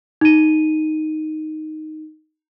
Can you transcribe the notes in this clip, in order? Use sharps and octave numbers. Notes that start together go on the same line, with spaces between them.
D#4 D#7